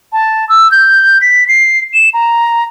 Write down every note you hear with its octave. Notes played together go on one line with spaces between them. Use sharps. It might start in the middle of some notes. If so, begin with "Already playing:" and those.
A5
E6
G6
B6
C7
E7
A#5